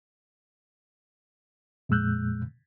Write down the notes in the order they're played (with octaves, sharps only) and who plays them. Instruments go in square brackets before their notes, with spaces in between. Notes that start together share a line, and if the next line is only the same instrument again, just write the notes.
[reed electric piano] F2 A#2 G#3 E6 F#6 G6